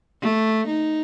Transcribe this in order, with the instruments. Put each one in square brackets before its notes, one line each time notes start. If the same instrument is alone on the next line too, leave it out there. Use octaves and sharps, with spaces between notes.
[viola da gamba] A3
D#4